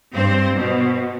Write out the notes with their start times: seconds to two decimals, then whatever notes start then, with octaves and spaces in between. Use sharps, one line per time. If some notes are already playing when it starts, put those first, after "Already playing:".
0.14 G2 C4 C5
0.56 B2